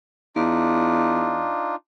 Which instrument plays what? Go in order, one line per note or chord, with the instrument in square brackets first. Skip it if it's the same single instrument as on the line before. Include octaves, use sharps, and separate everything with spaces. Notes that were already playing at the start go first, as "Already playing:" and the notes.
[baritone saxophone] E2 [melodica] D4 D#4 F4